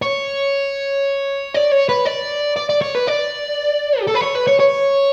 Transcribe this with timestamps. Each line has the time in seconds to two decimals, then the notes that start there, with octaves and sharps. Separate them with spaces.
0.02 C#5
1.54 D5
1.71 C#5
1.89 B4
2.06 D5
2.57 D5
2.70 D5
2.81 C#5
2.95 B4
3.07 D5
4.00 G4
4.07 A4
4.14 B4
4.22 C#5
4.35 B4
4.47 C#5
4.60 C#5